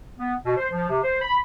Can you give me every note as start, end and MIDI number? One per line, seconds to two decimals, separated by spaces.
0.18 0.35 59
0.45 0.56 47
0.57 0.67 72
0.72 0.89 53
0.90 1.01 48
1.04 1.21 72
1.21 1.37 83